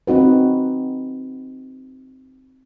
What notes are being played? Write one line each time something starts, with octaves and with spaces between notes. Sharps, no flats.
C4 D#4 F#4 B4